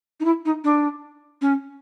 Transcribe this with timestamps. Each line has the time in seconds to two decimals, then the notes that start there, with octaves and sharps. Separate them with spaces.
0.20 D#4
0.25 E4
0.45 D#4
0.64 D4
1.41 C#4